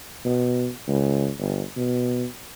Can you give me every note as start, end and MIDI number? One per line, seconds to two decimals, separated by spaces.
0.25 0.69 47
0.88 1.30 37
1.39 1.62 31
1.77 2.25 47